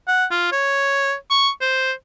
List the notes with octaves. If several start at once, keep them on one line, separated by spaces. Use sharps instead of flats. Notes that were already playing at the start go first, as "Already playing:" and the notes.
F#5
F4
C#5
C#6
C5